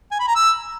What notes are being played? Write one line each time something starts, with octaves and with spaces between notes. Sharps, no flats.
G#5
B5
A#5
E6